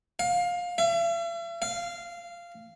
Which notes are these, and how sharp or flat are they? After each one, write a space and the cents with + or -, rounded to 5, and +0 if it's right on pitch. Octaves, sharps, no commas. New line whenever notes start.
F5 +20
E5 +45
F5 -15